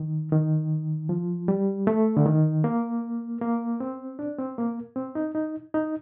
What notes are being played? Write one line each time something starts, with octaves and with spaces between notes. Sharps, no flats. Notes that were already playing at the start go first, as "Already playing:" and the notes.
Already playing: D#3
D#3
F3
G3
A3
D3
D#3
A#3
A#3
C4
D4
C4
A#3
C4
D#4
D#4
D#4